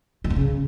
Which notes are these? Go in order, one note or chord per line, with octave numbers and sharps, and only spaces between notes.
D#3
G2
C#3